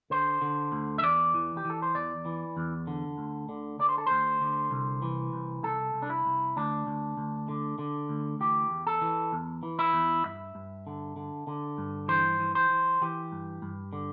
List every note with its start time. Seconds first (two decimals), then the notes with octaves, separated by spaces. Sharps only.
0.10 D3 C5
0.42 D3
0.72 D2
0.98 E5
1.03 E2 D5
1.34 E3
1.57 G4
1.65 E3 A4
1.82 C5
1.95 E2 D5
2.25 E3
2.57 E2
2.87 D3
3.18 D2
3.49 D3
3.79 D3 D5
3.89 C5
3.98 A4
4.07 D2 C5
4.41 D3
4.71 C2
5.02 E3
5.33 C2
5.63 C2 A4
5.94 C2
6.02 D4
6.10 E4
6.26 C2
6.56 D2 D4
6.87 D2
7.17 D2
7.49 D3
7.79 D3
8.09 D2
8.40 E3 G4
8.71 E2
8.87 A4
9.02 E3
9.33 E2
9.63 E3
9.79 E4
9.93 E2
10.25 G2 E5
10.55 G2
10.87 D3
11.16 D3
11.47 D3
11.78 G2
12.08 E3 C5
12.39 E3
12.55 C5
12.70 E3
13.01 E3 G4
13.32 G2
13.62 G2
13.93 D3